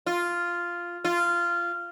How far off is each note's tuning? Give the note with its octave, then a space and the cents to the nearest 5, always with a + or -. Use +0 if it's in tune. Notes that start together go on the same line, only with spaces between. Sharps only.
F4 -5
F4 -15